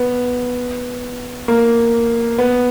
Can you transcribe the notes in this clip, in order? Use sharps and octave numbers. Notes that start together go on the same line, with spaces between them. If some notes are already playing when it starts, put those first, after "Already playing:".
Already playing: B3
A#3
B3